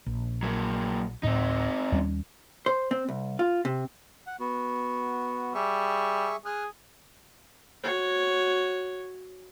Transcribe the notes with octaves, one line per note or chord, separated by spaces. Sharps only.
A#1
F#3 A#3
D1 A2 C4 D#4
D#2 G3 C#4
C5
C4
C2
F4
C3
F#5
B3 F#4
G3 G#4 E5 C#6
G#4 D#6 F6 F#6
F#4 C#5